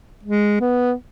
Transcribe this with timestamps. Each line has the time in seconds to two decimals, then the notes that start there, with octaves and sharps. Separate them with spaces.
0.23 G#3
0.61 B3